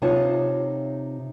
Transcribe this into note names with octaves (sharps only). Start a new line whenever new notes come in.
C3 D#4 F4 C#5 A5